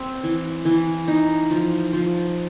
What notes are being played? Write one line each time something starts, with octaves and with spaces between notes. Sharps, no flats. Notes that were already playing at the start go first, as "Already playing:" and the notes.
Already playing: C4
E3
E3
D#4
F3
F3